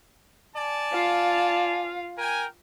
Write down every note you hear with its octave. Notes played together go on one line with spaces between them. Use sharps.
D5 G#5 A5
F4 F5
A#4 G5 G#5